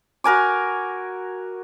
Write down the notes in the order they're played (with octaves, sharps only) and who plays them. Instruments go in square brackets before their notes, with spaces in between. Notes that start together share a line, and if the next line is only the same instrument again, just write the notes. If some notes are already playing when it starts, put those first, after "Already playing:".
[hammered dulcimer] F#4 A#4 G#5 D6